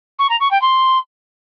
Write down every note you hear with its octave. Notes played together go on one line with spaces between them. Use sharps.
C#6
A#5
C#6
G5
C6